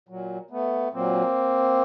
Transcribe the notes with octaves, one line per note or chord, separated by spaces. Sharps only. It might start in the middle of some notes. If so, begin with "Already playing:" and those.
A#2 F#3
A3 B3
A#2 F#3 A#3 C4